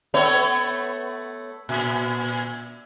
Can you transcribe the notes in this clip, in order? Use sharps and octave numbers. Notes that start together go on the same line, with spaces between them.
A3 B3 C#5
A#2